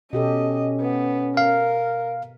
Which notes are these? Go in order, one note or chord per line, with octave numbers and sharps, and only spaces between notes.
B2 C#4 G4 A4 D#5
B3
A#4 F5